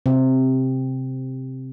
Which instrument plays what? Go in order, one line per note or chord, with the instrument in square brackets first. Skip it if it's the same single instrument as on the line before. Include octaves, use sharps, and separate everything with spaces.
[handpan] C3 C4